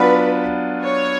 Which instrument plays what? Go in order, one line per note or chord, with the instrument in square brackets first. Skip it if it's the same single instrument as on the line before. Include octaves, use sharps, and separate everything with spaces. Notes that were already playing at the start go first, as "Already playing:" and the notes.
Already playing: [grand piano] F#3 B3 D4 F4 [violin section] B4
[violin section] C#5